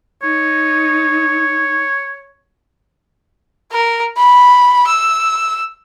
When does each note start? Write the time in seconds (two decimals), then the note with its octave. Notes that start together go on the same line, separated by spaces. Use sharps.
0.23 D#4 C#5
3.72 A#4
4.17 B5
4.87 E6